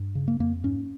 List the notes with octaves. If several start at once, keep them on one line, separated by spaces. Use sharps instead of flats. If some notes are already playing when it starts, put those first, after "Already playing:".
Already playing: G2
C#3
A#3
F2 A#3
G#2 C#4